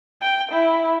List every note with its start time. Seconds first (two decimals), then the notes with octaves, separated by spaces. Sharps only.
0.22 G5
0.52 E4